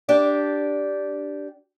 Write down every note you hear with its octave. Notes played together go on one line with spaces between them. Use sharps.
D4 G4 D5